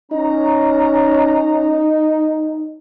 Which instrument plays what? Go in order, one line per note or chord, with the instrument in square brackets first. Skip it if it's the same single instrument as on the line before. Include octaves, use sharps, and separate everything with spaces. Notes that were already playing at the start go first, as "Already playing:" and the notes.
[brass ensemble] C#4 A#5 [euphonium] D#4